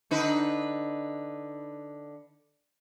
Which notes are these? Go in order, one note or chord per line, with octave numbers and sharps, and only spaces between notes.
D3 D#4 B4